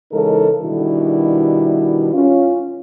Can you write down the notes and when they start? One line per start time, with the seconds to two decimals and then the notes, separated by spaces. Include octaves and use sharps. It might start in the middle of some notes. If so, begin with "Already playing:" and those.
0.11 C#3 E3 G#3 D#4 A4 A#4
0.61 B2 D#3 G3 D4 E4 F#4
2.13 C#4 F4